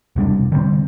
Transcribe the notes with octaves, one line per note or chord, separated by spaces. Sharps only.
E1 C3 G3 D4
D3 G3 A#3 C4